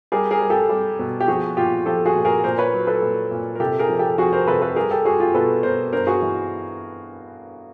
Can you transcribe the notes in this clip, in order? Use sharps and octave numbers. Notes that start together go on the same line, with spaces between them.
G3 G#4 A#4
G#4 A#4
G3
G4 A4
G3
B2
G4
F3 F#4 G#4
A#2 F4 G4
F3 G4 A4
F#4 G#4
A#2
G#4 A#4
A#2 A#4 C5
B4 C#5
F#3
A4 B4
A#2
A#2
A#4
C3 G4 A4
G#4 A#4
F3
G4 A4
F2 F#4 G#4
A#4 C5
C3 A4 B4
A4 B4
G3 G#4 A#4
G4 A4
G3 F#4 G#4
F4 G4
B2 A4 B4
B2 A#4 C5
G2 A#4 C5
F#4 G#4
E3